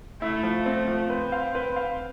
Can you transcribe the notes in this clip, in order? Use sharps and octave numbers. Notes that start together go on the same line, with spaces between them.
A3 E4
F3
C4
F3
C4 B4
F5
B4
F5